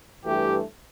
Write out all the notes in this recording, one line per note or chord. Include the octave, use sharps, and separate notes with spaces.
G2 E3 A3 G4